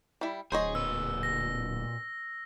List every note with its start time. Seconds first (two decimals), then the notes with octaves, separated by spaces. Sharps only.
0.21 G3 E4
0.52 D1 G#4 C5 C#5 D#5
0.75 A#2 B4 E6
1.23 A#6